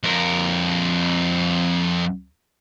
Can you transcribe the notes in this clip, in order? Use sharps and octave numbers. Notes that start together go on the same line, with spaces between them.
F2 A#4